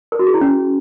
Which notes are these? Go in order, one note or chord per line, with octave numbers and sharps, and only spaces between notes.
A#4
F#4
G#4
E4
C#4